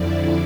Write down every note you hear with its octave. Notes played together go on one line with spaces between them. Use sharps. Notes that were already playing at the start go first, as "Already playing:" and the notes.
Already playing: F2 D3 F3 E4 D5